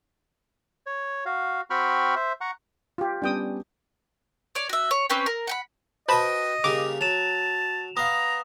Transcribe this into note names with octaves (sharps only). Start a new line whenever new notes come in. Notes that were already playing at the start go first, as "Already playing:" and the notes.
C#5
F#4 F5
C4 F#4 G5 B5 C#6 F6
C5 E5
F#5 A#5 C#6
F4 G4
G3 B3 C#4 D4 G5 D#6
C#5 D5
F#4 E5
C#5
C4 C#4 B4 G5
A#4
F#5 G5 B5
F#4 B4 C5 D#5 G5 A5 B5
C#3 G3 A#3 D6 F7
F#3 A5 E7 F7
B3 F5 A#5 D#6